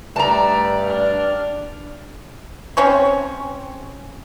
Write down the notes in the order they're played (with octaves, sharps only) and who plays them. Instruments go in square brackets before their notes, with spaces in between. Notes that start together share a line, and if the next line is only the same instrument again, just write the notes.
[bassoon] G2 [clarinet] A3 [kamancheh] D5 [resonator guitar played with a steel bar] A5 A#5
[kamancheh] D4 F6 [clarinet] D5
[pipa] C4 C#4 C#5